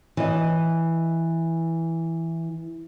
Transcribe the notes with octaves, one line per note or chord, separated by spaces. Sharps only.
E3 D#5